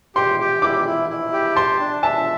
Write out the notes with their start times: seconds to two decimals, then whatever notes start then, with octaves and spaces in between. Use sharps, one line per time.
0.16 G4 C6
0.40 G4
0.62 E4 D6
0.86 E4
1.10 E4
1.33 G4
1.55 A5 C6
1.80 D4
2.03 E5 A5